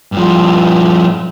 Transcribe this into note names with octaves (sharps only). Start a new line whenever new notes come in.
G2 F3